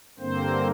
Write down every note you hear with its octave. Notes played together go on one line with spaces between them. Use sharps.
G2 D3 A#3 C4 C5